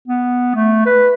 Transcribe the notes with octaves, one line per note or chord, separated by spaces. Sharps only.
B3
A3
B4